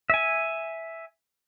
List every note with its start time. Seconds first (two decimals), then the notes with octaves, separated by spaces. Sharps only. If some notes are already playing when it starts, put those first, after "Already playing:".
0.10 E5 G#5